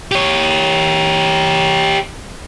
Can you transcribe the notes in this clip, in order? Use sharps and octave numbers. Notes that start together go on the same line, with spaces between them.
G4 C#5